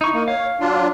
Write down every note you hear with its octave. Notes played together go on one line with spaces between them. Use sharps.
D#4 E4 C#6
A#3
C#5 F5
F#3 D4 F4